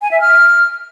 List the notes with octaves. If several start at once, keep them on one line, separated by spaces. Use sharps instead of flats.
G#5
E5
F6